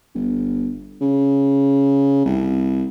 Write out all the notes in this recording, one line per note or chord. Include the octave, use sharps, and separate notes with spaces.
G1
C#3
C2